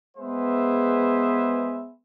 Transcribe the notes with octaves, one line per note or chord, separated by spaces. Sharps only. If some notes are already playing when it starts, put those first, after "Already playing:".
G#3 B3 G#4 B4 C5 E5